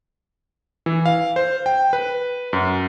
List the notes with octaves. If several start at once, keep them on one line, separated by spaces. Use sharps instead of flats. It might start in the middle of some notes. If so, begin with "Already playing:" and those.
E3
F5
C5
G5
B4
F#2